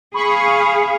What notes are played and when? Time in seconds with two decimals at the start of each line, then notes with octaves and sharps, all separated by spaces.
0.14 G#4 F5 B5 C#6